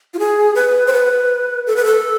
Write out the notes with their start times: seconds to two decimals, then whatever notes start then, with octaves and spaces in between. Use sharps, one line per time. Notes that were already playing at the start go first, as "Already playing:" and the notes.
0.14 F4
0.19 G#4
0.55 B4
0.87 C5
0.93 B4
1.67 A4
1.76 B4
1.85 A4